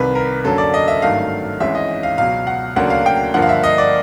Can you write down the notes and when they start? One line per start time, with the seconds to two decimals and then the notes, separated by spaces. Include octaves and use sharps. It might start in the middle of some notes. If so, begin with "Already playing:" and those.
Already playing: C2 C3 D#3 B4
0.15 A#4
0.44 F#2 D3 F#3 A#3 C#4 A4
0.58 D5
0.74 D#5
0.88 E5
1.02 G#1 G2 D#3 F#3 A3 F5
1.60 G#1 G#2 E3 G#3 C#4 E5
1.75 D#5
2.03 F5
2.18 C#2 B2 F#3 F5
2.47 F#5
2.76 D2 C#3 F#3 A#3 D4 F#5
2.90 F5
3.06 G5
3.34 G2 D3 F3 A#3 F#5
3.42 F5
3.49 E5
3.63 D#5
3.78 D5